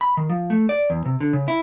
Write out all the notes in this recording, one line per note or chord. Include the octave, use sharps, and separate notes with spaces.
B5
D#3
F3
A3
D5
E2
C3
D3
C#3
E4